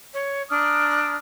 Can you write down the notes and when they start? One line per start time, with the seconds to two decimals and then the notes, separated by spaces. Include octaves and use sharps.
0.14 C#5
0.50 D4 A#5 D#6 F6